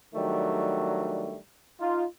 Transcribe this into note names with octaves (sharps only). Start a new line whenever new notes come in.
D#3 F#3 G3 A3 D4
D#4 F4